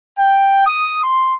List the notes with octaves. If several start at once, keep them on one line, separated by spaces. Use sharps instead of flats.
G5
D#6
C6